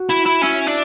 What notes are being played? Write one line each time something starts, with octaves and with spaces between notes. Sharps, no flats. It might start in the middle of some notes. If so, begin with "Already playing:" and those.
Already playing: F#4
E4
E4
C#4 E4
D4